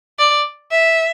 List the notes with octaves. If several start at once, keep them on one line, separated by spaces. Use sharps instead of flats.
D5
E5